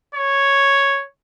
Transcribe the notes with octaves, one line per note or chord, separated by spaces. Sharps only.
C#5